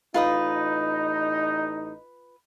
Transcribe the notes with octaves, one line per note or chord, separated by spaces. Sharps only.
A1 D#4 F4 B4 D#6